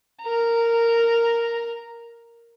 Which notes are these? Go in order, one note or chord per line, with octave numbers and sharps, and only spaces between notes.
A#4 A#5